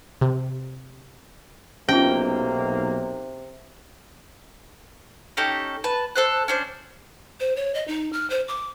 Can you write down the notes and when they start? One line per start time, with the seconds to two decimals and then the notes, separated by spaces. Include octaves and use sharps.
0.21 C3
1.89 B1 C3 A#3 C#4 F4 G5
5.37 C#4 D#4 G4 A4
5.84 B4 A5
6.15 A4 C5 F#6
6.48 C#4 D4 C5
7.40 C5
7.56 C#5
7.75 D#5
7.88 D#4
8.13 F6
8.30 C5
8.48 D6